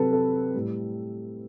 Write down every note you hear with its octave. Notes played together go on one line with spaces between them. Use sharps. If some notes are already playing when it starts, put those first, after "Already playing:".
Already playing: C3 F#3 A4 B4
A4
A2 G3